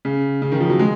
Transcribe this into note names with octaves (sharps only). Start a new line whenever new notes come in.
C#3
C#3
D#3
F3
F#3
G#3